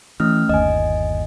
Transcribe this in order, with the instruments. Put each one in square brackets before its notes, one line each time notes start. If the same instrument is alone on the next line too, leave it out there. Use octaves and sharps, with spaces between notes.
[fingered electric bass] E3 [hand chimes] A3 C#4 F6
[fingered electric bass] G1 D#2 [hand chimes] D#5 G#5